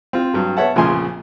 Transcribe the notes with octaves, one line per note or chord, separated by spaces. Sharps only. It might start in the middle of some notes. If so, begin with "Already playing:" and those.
C4 F4
G2 F#3
B3 C#5 E5 F#5 A5
A#1 F2 C#3 F3 G#5 C6